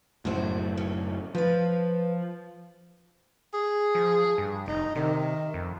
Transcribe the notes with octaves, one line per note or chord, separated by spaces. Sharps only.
F#1 F#2 A2 F#4 G#4 C5
C#4
F3 B4 F5
G#4
F3
G2
F1 D#4
C3 D#3
F2